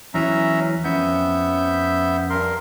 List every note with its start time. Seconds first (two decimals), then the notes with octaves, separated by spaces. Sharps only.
0.14 E2 E3 F#3 C#4 E5 A#5
0.84 F2 B3 C#4 E5 G6
2.30 G2 A#4 C6